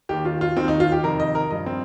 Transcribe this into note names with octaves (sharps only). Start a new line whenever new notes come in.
D#2 D#3 G4
F4
F4
D#2 D#3 C4
D#4
F4
G4
F2 C3 D#3 A#4
D#5
A#4
G2 F3 D#5
C4